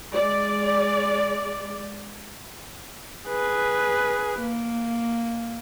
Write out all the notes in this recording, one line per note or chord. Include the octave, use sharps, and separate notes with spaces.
G#3 D5
G#4 B4
A#3